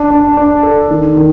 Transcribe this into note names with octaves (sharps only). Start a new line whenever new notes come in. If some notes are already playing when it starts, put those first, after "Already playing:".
Already playing: D4
D4
D4
A4
D#3
D#3